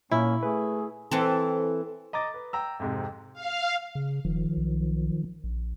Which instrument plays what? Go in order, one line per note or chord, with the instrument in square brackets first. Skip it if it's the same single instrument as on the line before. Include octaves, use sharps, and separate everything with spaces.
[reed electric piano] A#2 [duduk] A#3 [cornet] C#4 [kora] E4
[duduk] A3 [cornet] G#4 [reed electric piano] B4
[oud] E3 C4 A4
[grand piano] D#5 A#5 D6 A6
B4
G5 A#5 E6
F2 G#2 C3
[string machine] F5
[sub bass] C#3
[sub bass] E1 [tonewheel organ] D#3 F3
[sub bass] B1
A#1